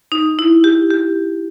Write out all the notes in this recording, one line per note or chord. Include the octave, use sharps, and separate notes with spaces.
D#4
E4
G4
G4